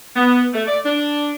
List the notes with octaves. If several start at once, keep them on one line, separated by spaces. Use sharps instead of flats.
B3
A3
D5
D4